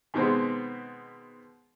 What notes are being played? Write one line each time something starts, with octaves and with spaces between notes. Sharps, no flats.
B2 D#3 G#3 B3 C4